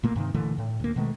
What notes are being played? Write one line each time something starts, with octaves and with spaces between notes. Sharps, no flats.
A#2 A3 A#3
G2 C3 D#3
A#2 D3 E3 A3
A2
D2 A#3
B2 D#3 G#3 A3